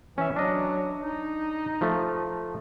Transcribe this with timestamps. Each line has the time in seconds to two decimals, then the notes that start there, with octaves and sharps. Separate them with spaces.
0.18 E3 C#4 E5
0.36 F#3 D4 D#5
1.00 D#4
1.81 F3 A3